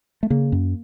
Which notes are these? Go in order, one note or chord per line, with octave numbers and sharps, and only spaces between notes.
A3
C#3 A#3
F#2